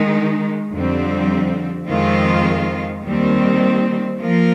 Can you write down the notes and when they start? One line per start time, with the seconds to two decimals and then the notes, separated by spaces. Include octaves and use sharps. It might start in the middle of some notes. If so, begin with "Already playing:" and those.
Already playing: D#3 G#3 D#4
0.72 F2 D3 G3 C4
1.87 F2 D#3 G#3 C4 F4
3.04 D#2 D#3 G3 C4
4.20 F3 A#3 F4 A#4